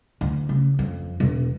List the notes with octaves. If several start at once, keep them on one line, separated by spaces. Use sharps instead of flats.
D2
C#3
F2
E1